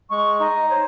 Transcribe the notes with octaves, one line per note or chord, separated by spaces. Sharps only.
G#3 C#6
D#4 D#5
C5 C#5